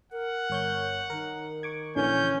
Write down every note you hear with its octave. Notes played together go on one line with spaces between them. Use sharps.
A#4 F#5
G1 C#5 G6
D#3 A#4
C#6 D6 G#6
A#1 D3 E3 C#4 G6